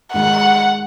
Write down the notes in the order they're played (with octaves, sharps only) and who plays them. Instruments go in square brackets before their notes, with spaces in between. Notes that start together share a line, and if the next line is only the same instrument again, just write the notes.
[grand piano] G#2 D#3 G#3 [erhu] F#5